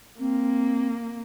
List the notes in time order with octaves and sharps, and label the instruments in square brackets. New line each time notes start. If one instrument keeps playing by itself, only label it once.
[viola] A#3 [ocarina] C4